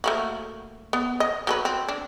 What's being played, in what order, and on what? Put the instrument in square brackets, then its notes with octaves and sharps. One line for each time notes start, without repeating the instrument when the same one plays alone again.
[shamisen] A3 A#3 F#4
B3
D#5
F#3 A4 B4
C4
D4